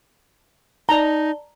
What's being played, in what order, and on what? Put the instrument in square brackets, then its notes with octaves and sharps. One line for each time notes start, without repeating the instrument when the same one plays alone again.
[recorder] D#4 [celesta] D5 A5 G7 [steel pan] A#5